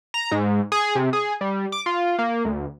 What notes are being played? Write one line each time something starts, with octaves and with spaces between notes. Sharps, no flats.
A#5
G#2
G#4
C3
G#4
G3
D6
F4
A#3
D2